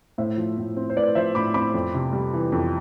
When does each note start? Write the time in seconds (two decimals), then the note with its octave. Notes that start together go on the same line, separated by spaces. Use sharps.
0.18 A2 C5 E5
0.37 F3
0.58 A2
0.76 C4
0.90 C5
0.96 A2 B4 D5
1.15 F3 C5 E5
1.35 A2 B5 D6
1.54 C4 B5 D6
1.74 F2
1.94 C3
2.13 G3
2.33 E3
2.52 F2